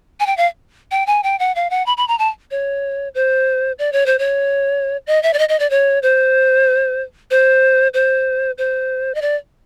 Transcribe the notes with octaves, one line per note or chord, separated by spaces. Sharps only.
G#5
G5
F5
G5
G#5
G5
F#5
F5
F#5
B5
B5
A#5
A5
C#5
C5
D5
C#5
C5
C#5
D#5
E5
D5
D#5
D#5
D5
C#5
C5
C5
C5
C5
D#5
D5